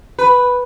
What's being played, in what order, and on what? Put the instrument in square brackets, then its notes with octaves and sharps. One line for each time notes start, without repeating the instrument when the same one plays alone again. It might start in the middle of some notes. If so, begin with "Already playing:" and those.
[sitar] B4